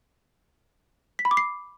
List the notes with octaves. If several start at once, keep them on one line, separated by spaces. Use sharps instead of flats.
B6
B5
D6
C7